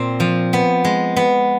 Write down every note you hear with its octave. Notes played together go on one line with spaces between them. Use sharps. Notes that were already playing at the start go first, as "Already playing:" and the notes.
Already playing: A#2 C4
F3
B3
G#3
B3